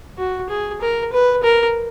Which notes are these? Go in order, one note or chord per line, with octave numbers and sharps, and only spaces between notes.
F#4
G#4
A#4
B4
A#4